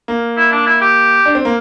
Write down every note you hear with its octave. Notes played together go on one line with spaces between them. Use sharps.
A#3
E4
D4
E4
G4
D4
C4
A#3